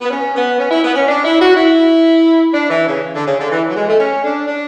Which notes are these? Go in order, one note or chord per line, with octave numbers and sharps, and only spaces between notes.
B3
C#4
B3
C#4
E4
B3
C#4
D4
E4
F#4
E4
D4
E3
C#3
D3
C#3
D3
E3
F#3
G#3
A3
C#4
D4
D4